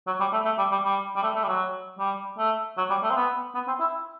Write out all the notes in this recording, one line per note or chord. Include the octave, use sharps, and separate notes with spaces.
F#3
G3
A3
A3
G3
G3
G3
G3
A3
A3
G3
F#3
G3
A3
F#3
G3
A3
C4
B3
B3
C4
E4